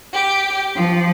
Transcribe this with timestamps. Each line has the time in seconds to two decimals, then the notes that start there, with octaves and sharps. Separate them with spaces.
0.13 G4
0.74 F3